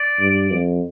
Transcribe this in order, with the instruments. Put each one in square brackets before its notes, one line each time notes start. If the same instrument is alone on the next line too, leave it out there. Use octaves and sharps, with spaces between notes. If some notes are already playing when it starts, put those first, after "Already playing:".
Already playing: [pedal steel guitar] D5
[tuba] G2
F2